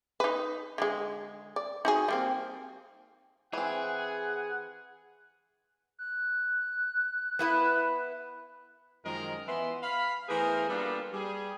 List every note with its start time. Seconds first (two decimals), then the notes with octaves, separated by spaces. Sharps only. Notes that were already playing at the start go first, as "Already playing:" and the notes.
0.20 D#4 B4
0.78 D3 F3 G#3
1.56 D5
1.85 D#4 F#4 G#4
2.08 G3 A#3 C4
3.53 E3 C4 G#4 F#5
5.99 F#6
7.39 B3 E4 B4
9.05 F#2 D#3 F3 G#3 F4 A#4
9.47 E3 B3 E4 B4 C6
9.82 F5 B5
10.28 E3 A3 B3 G#4 A#4 C5
10.69 G3 A#3 B3 D4 F4 A4
11.12 G3 G4 G#4